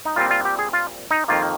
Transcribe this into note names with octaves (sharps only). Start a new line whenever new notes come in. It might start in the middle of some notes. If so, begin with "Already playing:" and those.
D#4
A#2 G3 C4 F4
F4
G4
G#4
F4
D#4
F2 D#3 A#3 F4